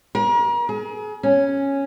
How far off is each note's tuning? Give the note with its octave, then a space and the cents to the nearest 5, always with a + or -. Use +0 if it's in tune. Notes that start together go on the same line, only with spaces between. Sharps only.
A#4 +40
G#4 +35
C#4 -5